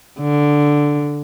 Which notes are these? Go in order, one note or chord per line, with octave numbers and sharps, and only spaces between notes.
D3